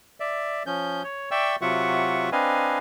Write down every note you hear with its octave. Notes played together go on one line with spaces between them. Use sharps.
D5 E5
F3 C#4 G6
C#5
D5 E5 G5 C#6 E6
C3 F#3 F4 E5 F#5 C#6
C4 D4 B4 D#5 F5 G#5